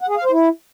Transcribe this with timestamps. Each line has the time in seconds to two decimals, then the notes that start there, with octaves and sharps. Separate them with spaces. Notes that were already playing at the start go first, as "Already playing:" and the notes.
0.01 F#5
0.09 G#4
0.16 F5
0.24 C5
0.31 E4